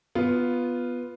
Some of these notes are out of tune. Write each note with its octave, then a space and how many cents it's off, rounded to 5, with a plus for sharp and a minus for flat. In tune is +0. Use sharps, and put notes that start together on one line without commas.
B3 +0 F4 +0